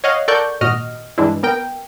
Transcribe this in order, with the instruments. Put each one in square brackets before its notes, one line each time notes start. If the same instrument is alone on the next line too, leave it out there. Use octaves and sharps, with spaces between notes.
[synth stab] C#5 D#5 F5 F#5
A4 A#4 D5 F#5 C#6 G6
G#1 A#2 F#4 D#5 F6
G2 E3 G#3 D4 E4
B3 A#4 G5